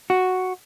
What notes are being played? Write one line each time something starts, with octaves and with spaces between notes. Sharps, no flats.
F#4